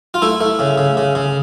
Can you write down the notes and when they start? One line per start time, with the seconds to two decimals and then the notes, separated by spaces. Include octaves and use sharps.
0.14 F4
0.22 A3 E4
0.41 A3
0.59 C#3
0.78 C#3
0.97 C#3
1.15 C#3